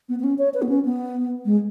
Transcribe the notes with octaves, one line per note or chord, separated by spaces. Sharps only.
B3
B3
C#4
C#5
B4
B3
C#4
B3
G#3